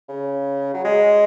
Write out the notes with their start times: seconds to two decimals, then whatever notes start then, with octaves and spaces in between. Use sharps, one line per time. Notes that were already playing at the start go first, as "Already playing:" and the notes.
0.09 C#3
0.74 F#3
0.84 G#3